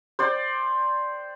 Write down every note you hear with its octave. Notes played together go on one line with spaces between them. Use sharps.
C5 D5 G5